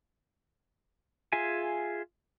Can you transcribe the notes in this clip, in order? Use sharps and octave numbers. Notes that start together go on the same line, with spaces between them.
F4 G#4 E5 G#5